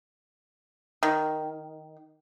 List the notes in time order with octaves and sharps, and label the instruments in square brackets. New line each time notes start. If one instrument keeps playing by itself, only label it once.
[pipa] D#3